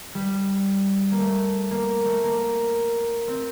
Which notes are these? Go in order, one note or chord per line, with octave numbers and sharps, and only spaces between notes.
G3
A#3
A3
A#3
A3
A#3
C4